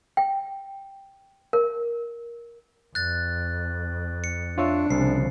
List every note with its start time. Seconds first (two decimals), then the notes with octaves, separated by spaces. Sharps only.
0.17 G5
1.53 A#4
2.95 F2 F#6 A6
4.24 C#7
4.58 D4 F4 C#5 E5
4.91 C2 C#3 F3 C7